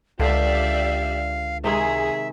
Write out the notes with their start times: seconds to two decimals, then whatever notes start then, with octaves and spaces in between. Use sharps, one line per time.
0.20 C#2 D3 G4 D5 E5 F5
1.64 C3 D#3 G#3 G#4 E5